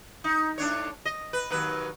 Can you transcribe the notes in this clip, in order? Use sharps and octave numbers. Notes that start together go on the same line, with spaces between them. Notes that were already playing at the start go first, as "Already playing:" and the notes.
D#4
A2 D4 C#5
D#5
B4
D#2 F#3 B4